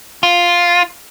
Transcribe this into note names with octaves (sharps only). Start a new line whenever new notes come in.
F4